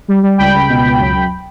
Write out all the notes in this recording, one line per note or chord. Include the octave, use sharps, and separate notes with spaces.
G3
G3
C#2 G5 B5
C#2
B2
C#2
F#2
F#2